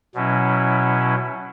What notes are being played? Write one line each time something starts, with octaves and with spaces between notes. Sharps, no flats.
B2 F#3 C#4 E4